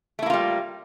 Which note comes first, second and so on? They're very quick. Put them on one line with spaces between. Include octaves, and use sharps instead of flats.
A3 E4 A#3 F4 G3